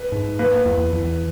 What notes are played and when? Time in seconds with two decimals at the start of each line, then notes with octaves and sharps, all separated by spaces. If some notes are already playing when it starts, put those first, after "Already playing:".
Already playing: B4
0.12 G#2
0.39 A#3 B4
0.65 E2
0.92 E2